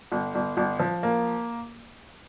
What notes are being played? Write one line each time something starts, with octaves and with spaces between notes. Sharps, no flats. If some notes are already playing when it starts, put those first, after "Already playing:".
G1
G1
G1
F3
A#3